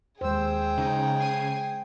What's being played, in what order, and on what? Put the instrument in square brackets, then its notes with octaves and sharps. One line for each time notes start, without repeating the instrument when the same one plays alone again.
[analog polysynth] D#2 E6 [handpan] G#3 C5 [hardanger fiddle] G#4 G5
[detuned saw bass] C#3 [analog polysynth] D#4
[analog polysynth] G#6 C7 D#7